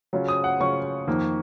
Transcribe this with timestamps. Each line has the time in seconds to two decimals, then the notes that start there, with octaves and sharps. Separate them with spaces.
0.13 C#3 F#3 C#4 F4
0.28 D#6
0.44 F#5
0.60 C#3 F#3 C#4 F4 C#6
1.07 F2 D#3 A#3